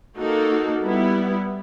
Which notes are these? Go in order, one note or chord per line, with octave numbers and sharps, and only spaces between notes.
A#3 D#4 F#4 A4
G3 B3 E4